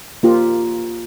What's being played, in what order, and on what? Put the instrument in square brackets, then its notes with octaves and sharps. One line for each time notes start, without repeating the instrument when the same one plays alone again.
[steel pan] A#3 F4 G4